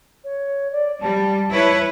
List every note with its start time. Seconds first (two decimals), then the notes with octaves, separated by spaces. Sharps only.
0.24 C#5
0.72 D5
1.02 G3 A5
1.52 E4 B4 C#5